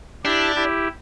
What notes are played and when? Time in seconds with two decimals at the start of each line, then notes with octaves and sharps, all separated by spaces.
0.24 D4 E4 G4
0.56 E4 G4